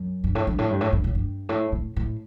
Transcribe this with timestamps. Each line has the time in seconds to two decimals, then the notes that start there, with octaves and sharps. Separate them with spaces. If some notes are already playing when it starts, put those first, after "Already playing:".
Already playing: F#2
0.24 G2
0.35 A2
0.47 G2
0.58 A2
0.70 G2
0.81 A2
0.93 G2
1.04 A2
1.15 G2
1.49 A2
1.72 A2
1.96 A2